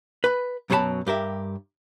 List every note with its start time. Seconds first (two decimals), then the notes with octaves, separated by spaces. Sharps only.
0.24 B4 B5
0.70 F#2 B2 F#3 G#4 A5 B5
1.07 G2 G4 A#4 E5